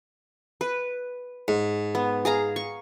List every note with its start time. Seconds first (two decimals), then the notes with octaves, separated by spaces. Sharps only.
0.61 B4
1.48 G#2
1.95 B3
2.25 G#4 F5 A#5
2.56 C#6